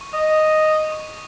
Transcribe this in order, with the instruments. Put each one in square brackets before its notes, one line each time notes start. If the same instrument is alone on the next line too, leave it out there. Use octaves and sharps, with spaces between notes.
[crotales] C#6
[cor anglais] D#5 [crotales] D#6
[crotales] C#6
D#6
C#6